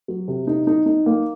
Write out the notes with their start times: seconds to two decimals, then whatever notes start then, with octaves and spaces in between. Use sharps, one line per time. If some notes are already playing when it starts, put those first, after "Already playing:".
0.08 F#3
0.28 C3
0.47 D#4
0.67 D#4
0.86 D#4
1.06 A#3